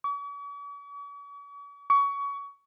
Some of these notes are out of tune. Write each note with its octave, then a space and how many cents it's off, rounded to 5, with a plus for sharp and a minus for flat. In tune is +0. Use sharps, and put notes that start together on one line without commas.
C#6 +45
C#6 +25